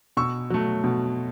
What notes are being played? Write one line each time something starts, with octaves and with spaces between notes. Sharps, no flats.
B2 C#6 E6
F#3 A3
B2